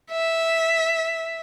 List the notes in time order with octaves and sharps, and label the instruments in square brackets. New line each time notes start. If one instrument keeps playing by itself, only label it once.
[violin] E5